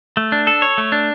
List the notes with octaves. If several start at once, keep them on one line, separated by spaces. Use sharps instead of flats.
A3
D4
A4
C#5
A3
D4